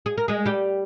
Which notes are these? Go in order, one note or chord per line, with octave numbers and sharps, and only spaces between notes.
G#4
A#4
G#3 G#4
G3 G4